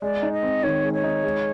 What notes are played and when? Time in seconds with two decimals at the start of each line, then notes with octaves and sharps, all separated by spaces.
0.02 G#3 D5
0.23 D#4
0.33 D#5
0.43 C4
0.63 D#3 C#5
0.83 G#3
0.93 C#5
1.04 D#4
1.24 G#3